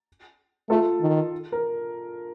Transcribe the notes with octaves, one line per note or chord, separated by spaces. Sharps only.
A3 F4 A4
D#3
A#4